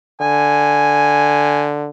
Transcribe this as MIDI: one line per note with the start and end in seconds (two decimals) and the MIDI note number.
0.21 1.90 50
0.21 1.66 80